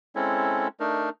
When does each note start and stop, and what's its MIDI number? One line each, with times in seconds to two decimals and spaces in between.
0.16 0.68 56
0.16 0.68 60
0.16 0.68 61
0.16 0.68 64
0.16 0.68 69
0.80 1.10 57
0.80 1.10 62
0.80 1.10 63
0.80 1.10 70